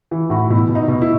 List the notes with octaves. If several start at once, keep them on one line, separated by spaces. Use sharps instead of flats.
E3
A2 F#4
B2 E4
B2
D#4
B2
E4